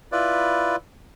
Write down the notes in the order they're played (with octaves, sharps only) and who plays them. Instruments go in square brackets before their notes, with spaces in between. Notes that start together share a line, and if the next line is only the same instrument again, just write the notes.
[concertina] E4 F4 B4 D5